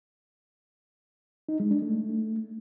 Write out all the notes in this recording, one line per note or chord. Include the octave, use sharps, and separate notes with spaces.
D#4
G#3
D4
A3